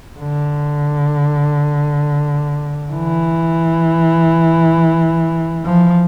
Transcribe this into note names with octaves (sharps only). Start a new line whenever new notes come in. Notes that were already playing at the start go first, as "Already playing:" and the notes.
D3
E3
F3